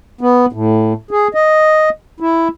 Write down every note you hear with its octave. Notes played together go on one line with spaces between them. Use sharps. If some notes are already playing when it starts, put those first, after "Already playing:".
B3
A2
G#4
D#5
E4